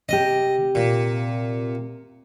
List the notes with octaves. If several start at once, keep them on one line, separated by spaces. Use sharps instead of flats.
C3 G4 D#5
A#2